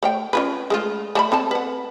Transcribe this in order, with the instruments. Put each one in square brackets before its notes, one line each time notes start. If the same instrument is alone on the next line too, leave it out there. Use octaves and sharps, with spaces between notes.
[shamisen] A3 C#5 G5
C#4 F4 B4
G#3 A3 F4
A3 A5 B5
C4 A4 A5
B4 F#5